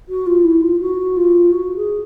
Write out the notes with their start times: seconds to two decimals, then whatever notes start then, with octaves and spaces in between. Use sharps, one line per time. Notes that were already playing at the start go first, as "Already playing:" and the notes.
0.09 F#4
0.27 F4
0.44 E4
0.62 F4
0.80 F#4
1.17 F4
1.52 F#4
1.76 G#4